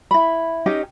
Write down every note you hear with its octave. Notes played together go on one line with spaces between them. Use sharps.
E4 B5
C#4 D#4 G4 D#5